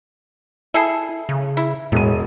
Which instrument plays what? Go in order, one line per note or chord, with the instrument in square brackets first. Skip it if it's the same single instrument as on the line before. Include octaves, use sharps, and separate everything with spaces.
[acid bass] E4 [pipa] G#4 A4 E5
[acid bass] C#3
[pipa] E4
[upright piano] E1 G#3 D#7 [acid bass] A2